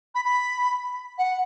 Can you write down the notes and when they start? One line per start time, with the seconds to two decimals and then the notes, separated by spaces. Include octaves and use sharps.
0.15 B5
0.25 B5
1.18 F#5